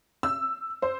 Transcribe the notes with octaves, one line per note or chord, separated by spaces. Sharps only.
E6
C5